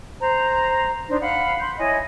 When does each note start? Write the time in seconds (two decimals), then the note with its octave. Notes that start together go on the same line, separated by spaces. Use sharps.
0.20 C5 A#5
1.09 D4 D#4 C5
1.21 F5 F#5 B5 F#6
1.59 B5 C6 G6
1.77 E4 C#5 D#5 G#5